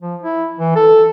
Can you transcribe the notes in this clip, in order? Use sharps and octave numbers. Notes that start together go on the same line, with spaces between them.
F3
E4
E3
A4